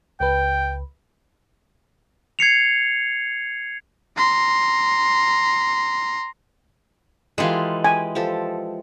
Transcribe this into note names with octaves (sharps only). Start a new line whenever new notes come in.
C#2 B4 G5
G#6 C7 C#7 F7
A#5 C6
E3 G#3 F4 G4 A4
G4 G#5
F3 G4 A4